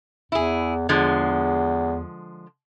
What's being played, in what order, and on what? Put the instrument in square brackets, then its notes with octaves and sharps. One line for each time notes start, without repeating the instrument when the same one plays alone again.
[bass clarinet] E2 [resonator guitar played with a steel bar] E4 G#4
[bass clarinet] E2 [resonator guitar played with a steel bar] D3 F3 G#3